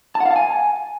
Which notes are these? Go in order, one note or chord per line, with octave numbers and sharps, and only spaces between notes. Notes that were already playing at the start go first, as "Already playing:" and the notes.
A5
F#5
F5
A5
G#5